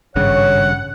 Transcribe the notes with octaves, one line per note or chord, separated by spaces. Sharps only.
G#1 G2 C#3 C#5 F#5